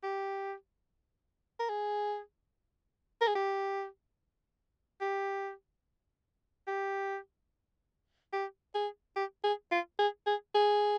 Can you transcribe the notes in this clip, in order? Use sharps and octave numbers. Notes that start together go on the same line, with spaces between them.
G4
A#4
G#4
A#4
G#4
G4
G4
G4
G4
G#4
G4
G#4
F4
G#4
G#4
G#4